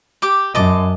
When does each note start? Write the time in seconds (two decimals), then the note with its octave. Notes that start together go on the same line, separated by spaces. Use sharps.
0.22 G4 D6
0.55 F#2 D#5 A5 D6